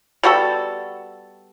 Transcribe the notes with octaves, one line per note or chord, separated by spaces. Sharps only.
G3 B3 F#4 A4